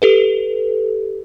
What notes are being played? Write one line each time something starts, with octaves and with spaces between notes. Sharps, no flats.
G4 A4 B4